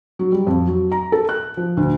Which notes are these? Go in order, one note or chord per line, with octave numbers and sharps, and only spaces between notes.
F#3
G3
F2
F#3
A#5
A4
F#6
F3
D2